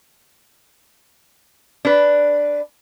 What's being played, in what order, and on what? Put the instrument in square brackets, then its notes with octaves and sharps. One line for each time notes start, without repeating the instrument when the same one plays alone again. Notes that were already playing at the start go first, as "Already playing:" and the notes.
[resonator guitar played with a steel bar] D4 B4